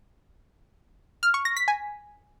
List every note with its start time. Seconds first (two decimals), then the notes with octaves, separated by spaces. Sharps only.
1.23 F6
1.34 C#6
1.45 A#6
1.57 B6
1.68 G#5